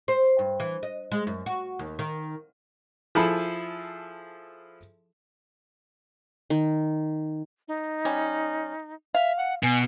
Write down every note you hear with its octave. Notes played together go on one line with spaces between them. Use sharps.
C5
G2
E3
D#5
G#3
F#2
F#4
D#2
D#3
F3 E4 G#4 A4 B5
D#3
D#4
G3 C#4
E5 F5
F#5
B2 G#5